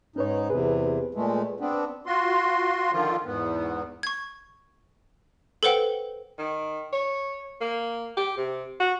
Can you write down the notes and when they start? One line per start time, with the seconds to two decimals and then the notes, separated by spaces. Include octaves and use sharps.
0.16 G#2 C#4 D#4 B4 C#5
0.50 E2 C3 G#4 B4
1.15 A#2 G#3 A3
1.60 B3 C4 D4
2.06 F4 F#4 C6
2.92 D3 D#3 F3 F4
3.25 E2 G#2 B3
4.03 C#6 G#6
5.63 A4 B4 C5 F#5 G5
6.38 D#3
6.93 C#5
7.61 A#3
8.17 G4
8.37 C3
8.80 F#4